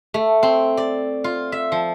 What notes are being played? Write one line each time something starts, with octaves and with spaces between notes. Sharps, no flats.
A3
C4
D5
F4
E5
F3